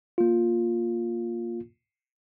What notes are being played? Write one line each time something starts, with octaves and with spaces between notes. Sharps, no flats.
A#3 F4